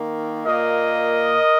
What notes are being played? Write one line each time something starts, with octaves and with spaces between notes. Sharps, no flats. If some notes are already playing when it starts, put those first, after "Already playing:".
Already playing: D#3 A#3
A#2 A#3 A#4 D#5